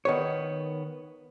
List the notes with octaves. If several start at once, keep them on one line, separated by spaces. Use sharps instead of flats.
D#3 B3 C#5